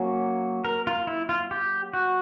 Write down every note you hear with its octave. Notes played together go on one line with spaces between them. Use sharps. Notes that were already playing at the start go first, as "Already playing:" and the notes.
Already playing: F#3 A#3 C#4
A#4
F4
E4
F4
G4
F#4